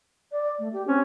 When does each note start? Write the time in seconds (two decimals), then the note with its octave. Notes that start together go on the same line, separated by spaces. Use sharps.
0.32 D5
0.59 A3
0.73 G4
0.87 C4 C#4